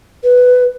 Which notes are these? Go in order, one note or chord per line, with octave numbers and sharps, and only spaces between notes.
B4